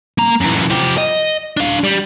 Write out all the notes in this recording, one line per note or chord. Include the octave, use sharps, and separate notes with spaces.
A#3 A#5
F#2 E3
F3 G4
D#5
D4 F5
G3